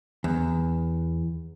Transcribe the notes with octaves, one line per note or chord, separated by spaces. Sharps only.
E2